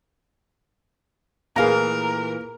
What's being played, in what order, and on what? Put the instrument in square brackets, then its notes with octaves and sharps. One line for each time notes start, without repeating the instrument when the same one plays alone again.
[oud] A#2 E3 A3 [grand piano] A#3 [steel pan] G#4 F5 A#5 [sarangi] A#4